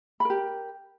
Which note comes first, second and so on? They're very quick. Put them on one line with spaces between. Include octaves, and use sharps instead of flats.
B5 A#4 G4